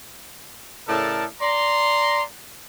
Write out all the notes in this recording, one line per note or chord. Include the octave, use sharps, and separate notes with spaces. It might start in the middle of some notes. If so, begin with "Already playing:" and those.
A2 C#3 A4 A#4 D5 A5
D5 A#5 C6